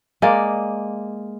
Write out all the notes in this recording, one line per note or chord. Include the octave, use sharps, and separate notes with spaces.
G#3 A#3 D5